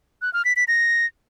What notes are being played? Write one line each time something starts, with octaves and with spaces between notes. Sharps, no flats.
F#6
F6
B6
B6
A#6